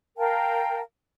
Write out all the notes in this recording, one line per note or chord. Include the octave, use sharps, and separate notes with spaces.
A#4 F5 G5 A5